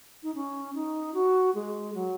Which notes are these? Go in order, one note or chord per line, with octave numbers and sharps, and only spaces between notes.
D#4
C#4
D#4
F#4
G#3
F#3